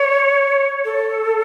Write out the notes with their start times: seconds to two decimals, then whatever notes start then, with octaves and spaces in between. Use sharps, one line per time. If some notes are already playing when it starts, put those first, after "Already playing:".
Already playing: C#5
0.85 A4